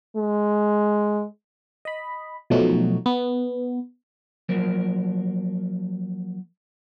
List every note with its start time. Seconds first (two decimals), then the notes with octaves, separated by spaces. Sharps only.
0.17 G#3
1.85 D#5 B5
2.50 B2 F3 F#3 A3 D#4 F#4
3.06 B3
4.49 F3 F#3 A#3 A#4